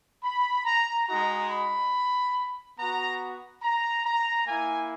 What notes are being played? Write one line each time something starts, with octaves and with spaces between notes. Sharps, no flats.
B5
A#5
G#3 D#4 F#4 A#5
B5
B3 F#4 A#5
A#5
A#5
A#3 E4 G#5